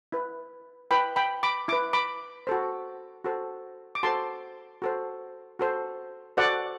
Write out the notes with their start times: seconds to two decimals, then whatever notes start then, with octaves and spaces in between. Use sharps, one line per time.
0.12 E4 B4
0.91 E4 B4 G5 B5
1.16 G5 B5
1.43 B5 D6
1.68 E4 B4 D6
1.93 B5 D6
2.47 F#4 A4 C5
3.24 F#4 A4 C5
3.95 D6
4.03 F#4 A4 C5 A5 C6
4.82 F#4 A4 C5
5.59 F#4 A4 C5
6.37 F#4 A4 C5 D5 F#5